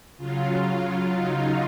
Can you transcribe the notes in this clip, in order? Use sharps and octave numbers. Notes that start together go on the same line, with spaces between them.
C#3 F#3 F4
D#4